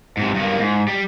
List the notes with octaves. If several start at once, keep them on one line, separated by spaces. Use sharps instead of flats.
G#2 C3
G2 A#3
G#2
G3